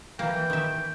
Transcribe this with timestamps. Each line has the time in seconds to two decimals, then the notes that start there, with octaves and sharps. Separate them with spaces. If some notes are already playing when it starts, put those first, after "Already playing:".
0.19 E3 A#3 G5
0.50 D#3 E5